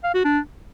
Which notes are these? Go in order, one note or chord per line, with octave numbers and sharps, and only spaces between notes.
F5
F#4
D4